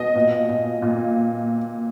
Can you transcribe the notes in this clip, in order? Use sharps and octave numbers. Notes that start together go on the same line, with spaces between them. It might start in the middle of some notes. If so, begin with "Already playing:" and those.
Already playing: B2 D#5
A#2
A#2
A#2